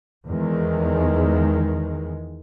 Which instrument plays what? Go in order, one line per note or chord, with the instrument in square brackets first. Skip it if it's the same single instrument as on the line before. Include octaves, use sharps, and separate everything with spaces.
[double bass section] E2 D#3 G#3